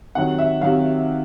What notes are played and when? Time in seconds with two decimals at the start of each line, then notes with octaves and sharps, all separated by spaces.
0.15 C3 D#3 F#3 F#5
0.38 E5
0.61 C3 D#3 F#3 F5